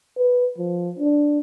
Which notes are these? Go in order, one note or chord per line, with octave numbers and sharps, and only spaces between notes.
B4
F3
D4